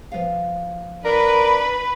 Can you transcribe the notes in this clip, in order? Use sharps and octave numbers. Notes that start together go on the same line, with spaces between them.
F3 B3 F5
D4 A#4 B4